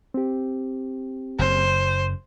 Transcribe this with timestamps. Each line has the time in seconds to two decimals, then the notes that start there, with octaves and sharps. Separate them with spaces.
0.14 C4 G4
1.39 F#1 F#2 C5